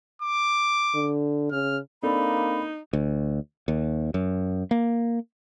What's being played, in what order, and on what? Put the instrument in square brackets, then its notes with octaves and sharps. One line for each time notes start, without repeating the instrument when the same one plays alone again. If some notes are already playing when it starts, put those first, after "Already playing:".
[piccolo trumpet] D6
[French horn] D3
[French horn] C#3 [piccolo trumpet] F6
[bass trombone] A#3 [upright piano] C4 D4 A4 [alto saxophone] D#4 [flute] B5
[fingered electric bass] D2
D#2
F#2
A#3